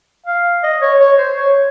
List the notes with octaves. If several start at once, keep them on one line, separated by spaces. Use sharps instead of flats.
F5
D#5
C#5
C#5
C5
C#5